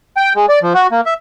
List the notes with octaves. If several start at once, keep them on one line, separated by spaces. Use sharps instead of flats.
G5
G#3
D5
F3
F#4
A#3
E5